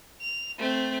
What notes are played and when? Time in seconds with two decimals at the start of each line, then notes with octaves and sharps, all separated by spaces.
0.21 F7
0.59 A3 C4